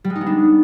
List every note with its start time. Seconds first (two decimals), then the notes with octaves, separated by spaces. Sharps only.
0.04 G3
0.10 G#3
0.15 D#4
0.21 B3
0.26 D4